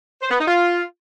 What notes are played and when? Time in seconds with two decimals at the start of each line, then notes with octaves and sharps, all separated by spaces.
0.22 C5
0.31 B3
0.39 D#4
0.48 F4